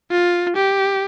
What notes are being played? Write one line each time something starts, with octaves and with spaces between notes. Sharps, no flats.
F4
G4